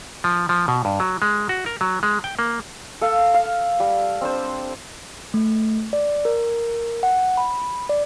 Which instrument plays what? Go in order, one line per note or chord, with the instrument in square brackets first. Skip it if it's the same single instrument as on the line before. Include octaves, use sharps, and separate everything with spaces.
[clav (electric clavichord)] F3
F3
B2
G2
F#3
G#3
F#4
A#4
F#3
G#3
G5
A#3
[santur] A4 F5
F5
G3
C4 D4 C5
[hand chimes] A3
D5
A#4
F#5
B5
D5